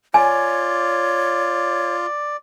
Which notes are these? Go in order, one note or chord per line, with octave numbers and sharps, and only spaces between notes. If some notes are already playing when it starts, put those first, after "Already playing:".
F4 C#5 D5 G#5